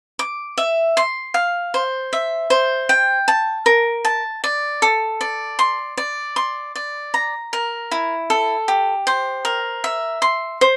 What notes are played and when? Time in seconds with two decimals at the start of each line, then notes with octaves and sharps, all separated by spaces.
0.19 D6
0.58 E5
0.97 C6
1.34 F5
1.74 C5
2.13 E5
2.50 C5
2.89 G5
3.28 A5
3.66 A#4
4.05 A5
4.44 D5
4.82 A4
5.21 D5
5.59 C6
5.97 D5
6.36 C6
6.75 D5
7.14 A#5
7.53 A#4
7.91 E4
8.30 A4
8.68 G4
9.07 C5
9.45 A#4
9.84 E5
10.22 C6
10.61 C5